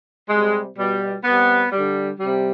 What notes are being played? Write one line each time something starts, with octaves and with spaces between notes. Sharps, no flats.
C3 G3 G#3
B2 G3
C3 G3 B3
D3 G3
C3 G3